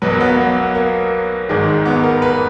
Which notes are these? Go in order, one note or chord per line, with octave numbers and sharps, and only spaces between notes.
B1 B2 F#3 B4
A#4
B3
A#3
B3
A#3
G#1 G#2 D#3 G#3
B3
A#4
B4